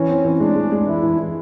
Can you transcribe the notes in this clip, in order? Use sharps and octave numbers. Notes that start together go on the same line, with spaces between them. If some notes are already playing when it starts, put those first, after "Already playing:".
Already playing: E3 C#4
C4
E3
G#3 D4
G#3
G#3
E3 E4
E3
E3